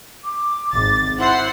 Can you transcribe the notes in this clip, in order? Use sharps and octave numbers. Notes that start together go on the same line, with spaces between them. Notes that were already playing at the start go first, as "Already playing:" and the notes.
D6
G#1 A6
E4 C5 F#5 C6